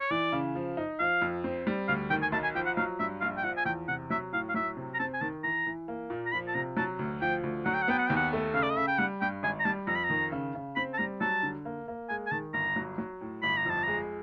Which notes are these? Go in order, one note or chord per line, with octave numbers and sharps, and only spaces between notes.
C#5
E3 D5
C#3
F3
D#4
F3 F5
F2
C4
G3
D2 F5
D#3 G5
G#5
B1 A5
G#5
F3 G5
F#5
F#3 F5
G2 E5
A#1 F5
G5
F3 F#5
G#5
E2 G5
C3 F#5
F#3 E5
A2 F5
F5
F#3 E5
C3
A#5
C4 A5
G#5
D#3 A5
E3 A#5
E3
A#3
A#2
A#5
F3 B5
A5
C3 A#5
F#3 A5
D2
F3 G5
D2
F#3 F#5
G5
F#5
B3 G5
F#5
D#2 G5
F#5
A3
C#3 F5
D5
D#5
C#3 E5
G5
G3 F#5
G2 G5
G#1 G#5
A#5
G3 A5
F2 A#5
B5
A#5
D#3
C#3
C#3
C4 B5
A5
G3 A#5
F#3 A5
D3
A#3
A#3
G#3 G#5
G#5
D#3 A5
G1 A#5
F#3
F#3
A2
G1 B5
A#5
F2 A5
G#3 A#5